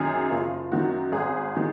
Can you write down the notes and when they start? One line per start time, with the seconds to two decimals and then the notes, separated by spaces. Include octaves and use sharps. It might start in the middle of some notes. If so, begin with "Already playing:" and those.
Already playing: F#2 D#3 G#4
0.30 F#1 F4
0.72 F#2 D#3 F#4
1.12 G#1 G#4
1.57 D#3